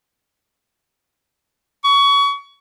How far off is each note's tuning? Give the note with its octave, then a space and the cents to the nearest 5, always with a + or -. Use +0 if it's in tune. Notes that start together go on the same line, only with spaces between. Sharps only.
C#6 +25